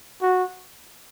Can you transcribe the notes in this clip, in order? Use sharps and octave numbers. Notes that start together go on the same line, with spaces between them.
F#4